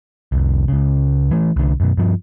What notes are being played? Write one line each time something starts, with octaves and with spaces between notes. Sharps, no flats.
F1 C2
C#2 C#3
E3 A3
C2 D3
F#2 B2
G2 F3